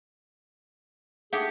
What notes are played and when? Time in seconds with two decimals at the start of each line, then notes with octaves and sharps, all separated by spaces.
1.33 A3 D4 G4 G#4 F#5